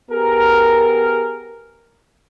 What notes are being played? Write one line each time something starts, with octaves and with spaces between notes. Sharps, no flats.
B3 G4 G#4 A#4